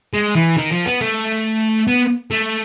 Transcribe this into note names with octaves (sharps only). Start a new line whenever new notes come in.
G#3
E3
D#3
F3
B3
A3
B3
A3